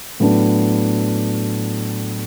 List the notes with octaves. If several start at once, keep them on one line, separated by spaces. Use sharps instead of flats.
A2 F#3 B3 D4